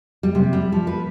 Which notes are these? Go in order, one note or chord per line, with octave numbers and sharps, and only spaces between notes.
G3
C3
G3
F3
B4